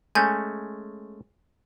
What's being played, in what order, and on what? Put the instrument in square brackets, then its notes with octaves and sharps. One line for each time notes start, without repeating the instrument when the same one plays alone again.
[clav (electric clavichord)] G#3 A3 C#4 [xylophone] G#5 G6